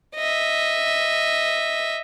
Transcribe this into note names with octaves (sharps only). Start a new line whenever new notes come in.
D#5 E5